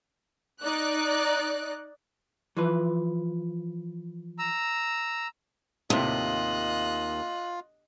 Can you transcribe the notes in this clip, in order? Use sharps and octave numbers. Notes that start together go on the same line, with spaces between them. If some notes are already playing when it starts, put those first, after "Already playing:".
D#4 D5 F#6
E3 F3 B4
A#5 E6
D#2 A2 C3 F4 D#5 F#6